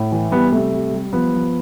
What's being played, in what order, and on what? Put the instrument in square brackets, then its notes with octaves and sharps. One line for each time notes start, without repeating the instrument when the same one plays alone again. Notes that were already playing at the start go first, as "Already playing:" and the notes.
Already playing: [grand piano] A2
E3
G3 B3
C3 A3
G3
G3
F3 B3
F3